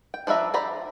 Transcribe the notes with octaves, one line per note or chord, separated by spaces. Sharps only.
G5
F3 D4 B4 E5 A#5
C5 D5 A#5 B5